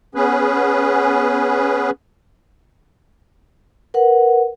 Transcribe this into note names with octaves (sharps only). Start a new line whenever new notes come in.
B3 C#4 G#4 B4
A#4 B4 F#5